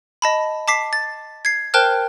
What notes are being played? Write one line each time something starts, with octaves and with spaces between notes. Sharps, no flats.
D#5 A5 B5
A5 D6 B6 C7
A6
G#6 C7
A#4 C5 G5 A5 F6 F#6